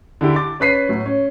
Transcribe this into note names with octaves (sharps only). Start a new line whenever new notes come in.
D3 E4 G4
D6 A6
C#4 B4 B6 C7 D#7
A2 F#3
C#4